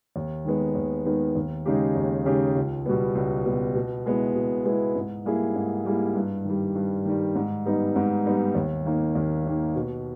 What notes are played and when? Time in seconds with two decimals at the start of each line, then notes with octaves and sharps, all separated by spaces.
0.16 D#2
0.45 D#3 G#3 B3
0.75 D#2
1.05 D#3 G#3 B3
1.35 D#2
1.66 C#3 G#3 D#4 G4
1.96 D#2
2.26 C#3 G#3 D#4 G4
2.56 C#2
2.86 B2 G3 B3
3.15 C#2
3.45 B2 G3 B3
3.75 B2
4.06 G#3 B3 E4
4.35 B2
4.65 G#3 B3 E4
4.96 G#2
5.25 G3 A#3 E4 G#4
5.55 G#2
5.85 G3 A#3 E4 G#4
6.15 G2
6.45 D#3 G3
6.75 G2
7.05 D#3 G3
7.35 G#2
7.66 G3 B3 D#4
7.96 G#2
8.26 G3 B3 D#4
8.55 D#2
8.85 D#3 A#3 D#4
9.15 D#2
9.45 D#3 A#3 D#4
9.75 B2